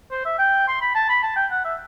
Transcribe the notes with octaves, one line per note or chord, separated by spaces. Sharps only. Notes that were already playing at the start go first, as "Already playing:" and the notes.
C5
E5
G5
C6
B5
A5
B5
A5
G5
F#5
E5